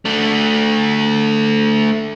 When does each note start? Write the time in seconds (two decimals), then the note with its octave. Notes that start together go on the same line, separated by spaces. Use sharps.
0.05 A3 D4